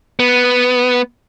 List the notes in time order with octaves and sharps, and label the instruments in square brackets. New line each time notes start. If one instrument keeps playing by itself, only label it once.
[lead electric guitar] B3